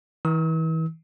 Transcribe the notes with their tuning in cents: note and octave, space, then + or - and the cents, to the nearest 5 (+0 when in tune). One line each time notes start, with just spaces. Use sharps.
E3 -35 E6 -45